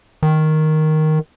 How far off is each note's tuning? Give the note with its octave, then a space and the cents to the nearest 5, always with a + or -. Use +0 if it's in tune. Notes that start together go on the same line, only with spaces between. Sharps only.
D#3 +0